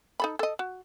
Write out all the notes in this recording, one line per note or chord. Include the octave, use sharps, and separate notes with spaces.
D#4 A4 B5
A4 D#5
F#4